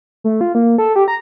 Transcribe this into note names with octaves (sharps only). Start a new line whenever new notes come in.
A3
F4
A#3
A4
G4
A#5